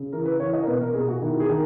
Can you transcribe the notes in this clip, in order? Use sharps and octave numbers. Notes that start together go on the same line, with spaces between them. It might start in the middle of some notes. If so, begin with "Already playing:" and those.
Already playing: C#3
E3 A#4
B4
E3 C#5
D#5
A#4
B2 B4
A#4
B2 G#4
F#4
D#3 E4
G#4
D#3